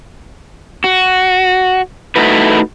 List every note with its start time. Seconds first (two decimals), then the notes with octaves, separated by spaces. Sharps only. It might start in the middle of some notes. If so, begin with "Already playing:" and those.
0.84 F#4
2.16 A3 D#4 E4 F#4 B4